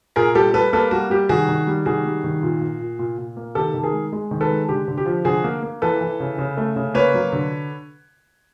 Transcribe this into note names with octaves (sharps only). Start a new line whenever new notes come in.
A#2 G#4 A#4
G3 G4 A4
G3 A4 B4
A#3 A4 B4
G3 F#4
G3 G4
D#3 F#4 G#4
D#3
G3
D#3 F#4 G#4
G3
D#3
A#2
A#2
A#2
A#2
A#2
A#3
D#3 G4 A4
D#3
G#4 A#4
G#3
G#3
D#3
A4 B4
G#3
D3 G4
D3
G4
F3
D3 F#4 G#4
A#3
A#3
E3 A4 B4
E3
C#3
C#3
A3
C#3
A#3 B4 C#5
F#3
D3